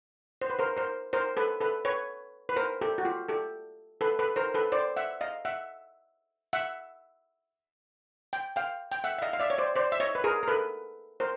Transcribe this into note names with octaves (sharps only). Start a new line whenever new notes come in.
C5
B4
A#4 C5
A#4 C5
A#4 C5
A4 B4
A4 B4
B4 C#5
B4
A#4 C5
G4 A4
F#4
F4 G4
G4 A4
A4 B4
A4 B4
A#4 C5
A4 B4
C5 D5
E5 F#5
D#5 F5
E5 F#5
E5 F#5
G5
F5 G5
G5
E5 F#5
E5
D#5 F5
F5
D5 E5
C#5
C5 D5
C5 D5
E5
C#5 D#5
B4
G#4 A#4
A#4
A4 B4
A#4 C5